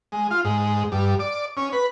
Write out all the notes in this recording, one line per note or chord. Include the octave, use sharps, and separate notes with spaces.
G#3
F4
G#2
G2
D5
C#4
B4